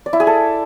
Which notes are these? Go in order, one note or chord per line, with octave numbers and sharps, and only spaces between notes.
D5
E4
G#4
A4